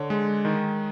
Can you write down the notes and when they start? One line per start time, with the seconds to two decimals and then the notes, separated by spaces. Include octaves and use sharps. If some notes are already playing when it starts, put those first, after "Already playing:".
Already playing: D3 C#5
0.10 G#3
0.45 D#3